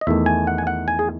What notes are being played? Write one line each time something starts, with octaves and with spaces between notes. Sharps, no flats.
D#5
E2 D#3 A3 E5
G#5
F#5
G#5
F#5
G#5
G#4